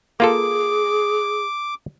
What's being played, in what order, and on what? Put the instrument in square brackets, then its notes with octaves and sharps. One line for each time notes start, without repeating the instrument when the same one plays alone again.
[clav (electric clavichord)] A#3 F4 A4 [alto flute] G#4 [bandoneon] D6